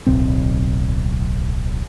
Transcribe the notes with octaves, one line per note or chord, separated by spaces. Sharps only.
D1 B1 C4